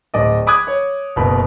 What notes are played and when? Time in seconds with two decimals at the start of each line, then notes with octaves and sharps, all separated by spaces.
0.14 D1 D5 D#5
0.47 B5 D6 D#6 F#6 G#6
0.67 C#5
1.16 F#1 B2 B5